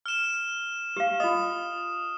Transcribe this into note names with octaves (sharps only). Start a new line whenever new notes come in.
F6 E7
G4 F5
F4 D#5 D#6